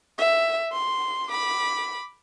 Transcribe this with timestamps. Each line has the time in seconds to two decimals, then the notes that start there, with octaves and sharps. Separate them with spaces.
0.18 E5
0.72 C6
1.29 B5 D6